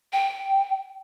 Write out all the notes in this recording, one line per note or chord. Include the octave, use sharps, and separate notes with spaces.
G5